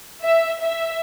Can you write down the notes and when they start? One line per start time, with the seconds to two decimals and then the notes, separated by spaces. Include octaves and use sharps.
0.23 E5
0.61 E5